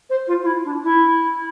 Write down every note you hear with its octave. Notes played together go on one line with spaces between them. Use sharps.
C5
F4
F4
E4
D4
E4